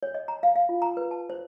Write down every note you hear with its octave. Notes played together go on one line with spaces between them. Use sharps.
C#5
D#5
A#5
F5
F5
F4
A#5
B4
A5
C5